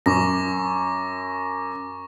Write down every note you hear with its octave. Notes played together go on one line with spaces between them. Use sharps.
F#2 C#6 D6 A#6